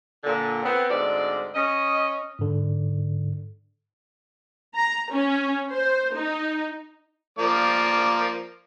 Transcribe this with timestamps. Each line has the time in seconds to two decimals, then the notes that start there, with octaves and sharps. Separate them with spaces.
0.24 A#2 D3
0.63 B3 C4
0.89 D2 G#2 C4 D5
1.55 C#4 D#5
2.39 G#2 D3
4.76 A#5
5.11 C#4
5.71 C5
6.15 D#4
7.39 F3 A#3 D5